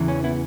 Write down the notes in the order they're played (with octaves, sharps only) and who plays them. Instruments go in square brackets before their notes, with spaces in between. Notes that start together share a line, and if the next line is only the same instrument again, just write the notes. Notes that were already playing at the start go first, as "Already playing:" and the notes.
Already playing: [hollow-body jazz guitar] E2 C#3 E3
C#4
B3 E4